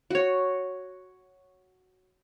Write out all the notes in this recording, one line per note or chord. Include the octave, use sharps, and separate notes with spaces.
F#4 C#5